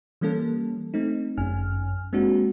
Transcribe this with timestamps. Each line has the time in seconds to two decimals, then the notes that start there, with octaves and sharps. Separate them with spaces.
0.21 E3 G3 A#3 C#4 A4
0.94 A3 C4 D#4
1.38 G1 F#2 C#4 G#5 F6
2.13 G#3 A#3 C4 D4 F#4